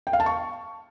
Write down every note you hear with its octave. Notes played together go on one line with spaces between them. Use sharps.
G5
F5
A5
C#6